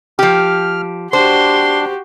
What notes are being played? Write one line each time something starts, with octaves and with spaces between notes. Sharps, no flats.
F3 G4 F6
D4 F#4 G4 C5 C6